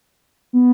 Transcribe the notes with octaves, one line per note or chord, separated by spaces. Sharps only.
B3